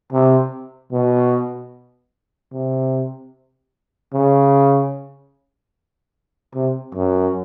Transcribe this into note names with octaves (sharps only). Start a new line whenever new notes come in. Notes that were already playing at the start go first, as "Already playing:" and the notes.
C3
B2
C3
C#3
C3
F#2